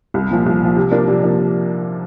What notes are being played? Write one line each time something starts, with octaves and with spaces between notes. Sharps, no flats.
C2
A#2 F3
C2
A#2 F3
C3
F3 A#3 D4
C3
F3 A#3 D4